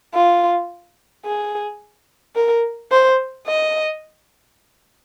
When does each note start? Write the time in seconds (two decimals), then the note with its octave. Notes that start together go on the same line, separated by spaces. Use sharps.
0.14 F4
1.25 G#4
2.36 A#4
2.92 C5
3.47 D#5